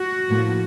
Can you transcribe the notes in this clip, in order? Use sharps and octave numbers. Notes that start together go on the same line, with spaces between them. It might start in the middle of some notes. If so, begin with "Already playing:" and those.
Already playing: F#4
A2 F3 A#3